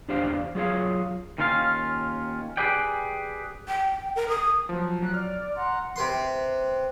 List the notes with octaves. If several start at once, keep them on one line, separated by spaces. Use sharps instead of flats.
E2 D4 G4 C5 D5 F5
F#3 F4 G#4 C5 C#5 F5
D#2 D#3 C#4 F4 A#4 F5
G4 G#4 B4 D5 G5
G5
A#4
D#6
F3 F#3
F#3 F#6
D5 F6
F#5 A#5 C6
C3 B4 C6